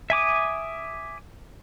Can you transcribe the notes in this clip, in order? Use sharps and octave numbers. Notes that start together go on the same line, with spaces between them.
E5 G#5 D6 D#6